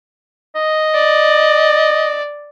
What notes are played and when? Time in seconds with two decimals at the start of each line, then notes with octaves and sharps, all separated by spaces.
0.56 D#5
0.95 D5